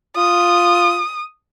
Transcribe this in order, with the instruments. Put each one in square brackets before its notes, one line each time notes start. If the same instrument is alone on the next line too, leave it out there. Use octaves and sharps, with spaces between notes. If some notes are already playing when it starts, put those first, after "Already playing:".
[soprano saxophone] F4 [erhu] D#6